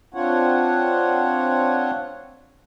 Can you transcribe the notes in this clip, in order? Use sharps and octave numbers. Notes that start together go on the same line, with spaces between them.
C4 D4 F4 C#5 F#5